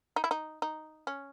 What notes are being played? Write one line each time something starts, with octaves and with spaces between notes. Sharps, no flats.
D#4
E4
D#4
D#4
C#4